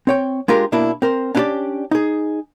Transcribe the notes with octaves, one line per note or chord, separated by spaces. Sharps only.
C4 C#5 G5
G#3 D4 F4 G4 A#4
B2 A#3 D4 E4
C4 A#4 C5
C#4 D4 E4 F#4 G4 D5
D#4 G#4